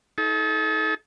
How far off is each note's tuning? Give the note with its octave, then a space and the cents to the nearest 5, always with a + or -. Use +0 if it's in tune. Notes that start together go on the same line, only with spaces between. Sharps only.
D#4 +40 A4 -30